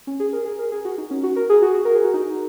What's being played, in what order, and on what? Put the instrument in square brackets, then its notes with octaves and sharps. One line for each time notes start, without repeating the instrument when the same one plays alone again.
[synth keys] C#4
G#4
A#4
G#4
A#4
G#4
F#4
D#4
C#4
F#4
A#4
G#4
F#4
A#4
G#4
F#4
D#4